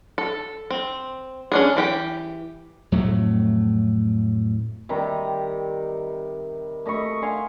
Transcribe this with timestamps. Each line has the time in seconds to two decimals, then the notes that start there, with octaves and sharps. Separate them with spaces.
0.18 A4
0.70 C4
1.52 C#4 D4 G#4
1.76 E3 G4 G5
2.92 F2 A2 F#3 A3
4.89 C3 D#3 G3 A#5
6.86 A3 D#5 B5 C#6
7.22 F5 F#5 G#5 C6